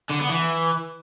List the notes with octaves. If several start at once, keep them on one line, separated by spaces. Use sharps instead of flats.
D3
B3
E3